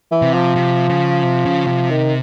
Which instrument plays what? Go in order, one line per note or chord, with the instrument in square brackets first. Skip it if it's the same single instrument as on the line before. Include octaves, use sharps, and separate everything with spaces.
[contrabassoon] E3
[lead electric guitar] C3
[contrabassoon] F3
[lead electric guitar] C3
C#3
C3
C#3
C3
[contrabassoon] D#3